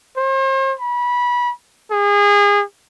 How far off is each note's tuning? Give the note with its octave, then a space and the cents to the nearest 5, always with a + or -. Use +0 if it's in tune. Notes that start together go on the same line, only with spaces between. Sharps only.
C5 +40
B5 -25
G#4 -30